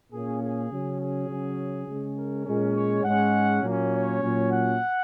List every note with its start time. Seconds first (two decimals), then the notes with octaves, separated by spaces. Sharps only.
0.12 A#2 A#3 C#4 G#4
0.42 G#4
0.71 C#3 F#3 C#4
1.00 G#4
1.29 C#3 F#3 C#4
1.87 C#3 G#3 C#4
2.16 A#4
2.45 A#2 G#3 C#4
2.74 C#5
3.03 G#2 G#3 C#4 F#5
3.61 A#2 F#3 A#3 C#4
3.91 C#5
4.19 A#2 F#3 C#4
4.49 F#5